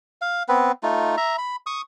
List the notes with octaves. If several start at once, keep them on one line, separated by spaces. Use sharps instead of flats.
F5
B3 C4 B4
A3 D#4 F4
E5 A#5
B5
C#6 D#6